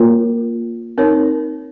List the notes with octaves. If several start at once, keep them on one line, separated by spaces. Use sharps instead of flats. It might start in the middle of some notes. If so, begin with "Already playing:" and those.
Already playing: A#3 F4 A#4 C#5
C4 D#4 A#4 C#5